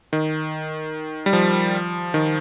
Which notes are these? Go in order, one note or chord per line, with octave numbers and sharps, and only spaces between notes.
D#3
G3
F3
D#3